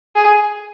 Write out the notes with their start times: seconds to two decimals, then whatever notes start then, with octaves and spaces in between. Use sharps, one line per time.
0.15 G#4